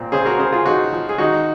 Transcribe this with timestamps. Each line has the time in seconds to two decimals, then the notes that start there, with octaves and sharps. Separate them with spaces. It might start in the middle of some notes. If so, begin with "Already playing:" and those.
Already playing: A#2 C4
0.12 C#3 G#4 C5
0.26 F#4 A#4
0.39 C#3 G#4 C5
0.52 F4 G#4
0.66 F3 D#4 F#4
0.93 F3
1.09 G#4
1.18 D#3 D#4 F#4